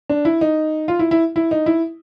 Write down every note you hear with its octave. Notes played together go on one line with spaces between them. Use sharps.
D4
E4
D#4
F4
E4
E4
E4
D#4
E4